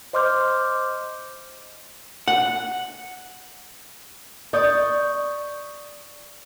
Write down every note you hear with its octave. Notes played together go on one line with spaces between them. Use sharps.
C5 D#5 C6 D6 F6 G6
F#5
D5 C#6 D#6 G6